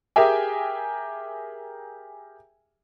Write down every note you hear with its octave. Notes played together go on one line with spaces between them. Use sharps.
G4 G#4 A#4 E5 G5 G#5